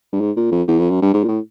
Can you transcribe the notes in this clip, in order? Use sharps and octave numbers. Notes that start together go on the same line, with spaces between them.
G2
G#2
A#2
F2
E2
F2
F#2
G2
G#2
A#2
A2